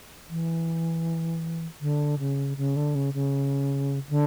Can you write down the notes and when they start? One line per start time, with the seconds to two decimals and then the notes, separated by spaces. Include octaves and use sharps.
0.29 E3
1.81 D3
2.19 C#3
2.57 C#3
2.76 D3
2.95 C#3
3.14 C#3
4.09 D3